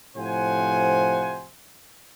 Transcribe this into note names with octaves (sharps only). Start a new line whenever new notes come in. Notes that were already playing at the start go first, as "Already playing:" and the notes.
A2 C3 F3 C5 F#5 G#5